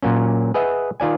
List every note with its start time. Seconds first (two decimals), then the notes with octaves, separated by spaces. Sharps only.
0.02 A#2 F#3 A#3 C#4
0.54 G#4 B4 D#5 E5 F#5
1.00 D#3 F4 D5 G#5